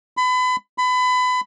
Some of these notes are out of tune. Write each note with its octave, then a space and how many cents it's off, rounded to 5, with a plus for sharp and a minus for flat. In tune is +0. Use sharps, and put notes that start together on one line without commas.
B5 +30
B5 +25